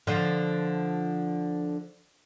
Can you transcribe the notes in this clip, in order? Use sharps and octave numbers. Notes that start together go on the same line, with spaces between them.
D3 F3